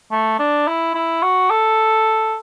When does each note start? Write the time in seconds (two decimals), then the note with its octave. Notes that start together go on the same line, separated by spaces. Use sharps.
0.11 A3
0.39 D4
0.67 E4
0.95 E4
1.23 F#4
1.50 A4